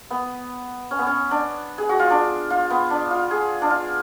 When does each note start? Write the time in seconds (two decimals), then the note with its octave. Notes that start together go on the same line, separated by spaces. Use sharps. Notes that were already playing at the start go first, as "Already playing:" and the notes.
0.10 B3
0.91 C#4
0.99 B3
1.07 C#4
1.31 D4
1.78 G#4
1.89 F#4
1.99 F4
2.10 D4
2.50 F4
2.70 B3
2.90 D4
3.11 F4
3.31 G#4
3.62 D4
3.70 F4